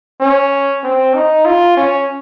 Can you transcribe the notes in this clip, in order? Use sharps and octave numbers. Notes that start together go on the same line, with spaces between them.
C#4
C4
D#4
F4
C#4